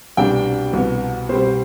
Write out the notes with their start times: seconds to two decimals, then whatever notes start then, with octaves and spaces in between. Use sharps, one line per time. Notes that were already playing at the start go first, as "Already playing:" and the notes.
0.17 C2 B2 G3 D4 G5
0.73 C2 B2 B3
1.29 B2 G3 C4 C5